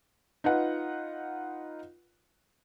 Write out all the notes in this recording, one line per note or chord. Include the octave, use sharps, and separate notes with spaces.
D#4 F4 B4 F#5